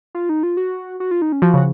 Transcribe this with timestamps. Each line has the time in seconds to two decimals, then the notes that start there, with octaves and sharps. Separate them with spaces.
0.15 F4
0.29 D#4
0.43 F4
0.57 F#4
1.00 F#4
1.11 F4
1.22 D#4
1.32 C#4
1.42 F3 F#4
1.54 C#3
1.57 F#4